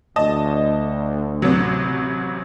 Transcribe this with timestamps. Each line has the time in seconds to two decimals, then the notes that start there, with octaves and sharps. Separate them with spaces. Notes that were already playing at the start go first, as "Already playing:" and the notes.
0.16 D2 D#5 A5
1.42 A1 C3 F#3